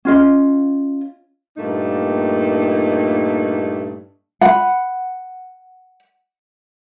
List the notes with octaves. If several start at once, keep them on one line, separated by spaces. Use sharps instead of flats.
C#4 F4 D#5
G2 A#2 A3 A#3 D#4
F#5 B5